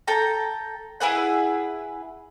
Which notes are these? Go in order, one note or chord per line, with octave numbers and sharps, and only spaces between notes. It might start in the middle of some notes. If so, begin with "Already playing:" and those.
A4 G5 A#5
E4 G#4 B4 F#5